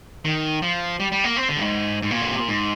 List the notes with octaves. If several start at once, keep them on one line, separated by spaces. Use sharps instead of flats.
D#3
F3
G3
G3
A#3
C4
D3
G2
G#2
G#2
A#2
D3
C3
A#2
G#2